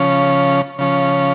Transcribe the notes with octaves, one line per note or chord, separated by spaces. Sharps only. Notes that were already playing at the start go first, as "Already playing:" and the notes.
Already playing: C#3 F3 C#4
C#3 F3 C#4